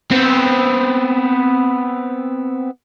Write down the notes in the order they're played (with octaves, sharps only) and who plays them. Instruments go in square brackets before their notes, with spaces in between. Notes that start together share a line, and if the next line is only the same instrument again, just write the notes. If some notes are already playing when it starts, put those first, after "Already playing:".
[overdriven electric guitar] B3 C4